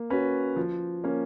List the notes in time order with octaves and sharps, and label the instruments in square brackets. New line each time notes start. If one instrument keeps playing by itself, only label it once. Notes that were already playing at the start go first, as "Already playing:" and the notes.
Already playing: [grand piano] A#3
C#4 F#4 B4
F3
A#3 C#4